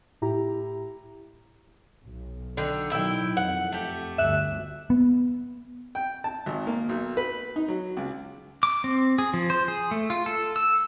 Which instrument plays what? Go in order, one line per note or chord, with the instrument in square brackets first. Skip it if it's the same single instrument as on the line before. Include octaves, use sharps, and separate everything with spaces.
[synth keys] A2 E4 G4 A#5
[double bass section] B1
[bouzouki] D3 D#3
[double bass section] B2 D#3 F#3 [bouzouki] E4 G5
[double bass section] F2 [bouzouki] F#5
[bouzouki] A3 G4
[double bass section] G1 D2 [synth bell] E5 F#6
[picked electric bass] B3
[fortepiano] G5
A5
G#1
A#3
B1
B4
D#4
F#3
C#2
[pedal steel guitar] D6
C4
G#4
F3
C5
G#4
A3
F4
A4
E6